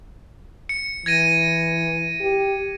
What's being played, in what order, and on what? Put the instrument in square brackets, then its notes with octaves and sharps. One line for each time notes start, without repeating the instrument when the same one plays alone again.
[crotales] C#7
[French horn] E3 [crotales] G#6 A#6 D#7
[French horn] G4